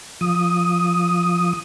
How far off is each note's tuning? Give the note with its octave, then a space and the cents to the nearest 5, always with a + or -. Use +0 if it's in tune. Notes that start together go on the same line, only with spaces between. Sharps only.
F3 +0 D#6 +0